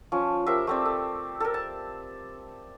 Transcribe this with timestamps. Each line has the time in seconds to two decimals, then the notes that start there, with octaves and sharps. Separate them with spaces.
0.12 F3 C#4
0.46 G4 A#4 C5 E5
0.67 A3 C4 D5
0.85 A4
1.40 A4 A#4
1.54 A5